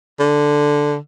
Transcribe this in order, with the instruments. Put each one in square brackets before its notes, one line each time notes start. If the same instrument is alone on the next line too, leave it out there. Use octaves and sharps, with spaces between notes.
[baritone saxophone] D3